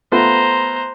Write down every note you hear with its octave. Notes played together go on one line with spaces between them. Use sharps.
A3 B3 F4 C5 A#5